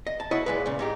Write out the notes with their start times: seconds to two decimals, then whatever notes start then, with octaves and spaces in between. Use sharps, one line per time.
0.07 D#5
0.20 A5
0.31 E4 F#4 C#5 D#5
0.46 A#2 G#3 B4
0.66 A#2 C#3
0.79 G#2 D#4 G4